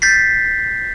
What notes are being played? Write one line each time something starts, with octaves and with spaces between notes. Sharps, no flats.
G6 A6 B6 C7